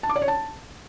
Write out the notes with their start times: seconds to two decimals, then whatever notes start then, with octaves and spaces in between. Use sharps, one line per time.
0.03 A5
0.09 D6
0.16 D5
0.22 C#5
0.28 A5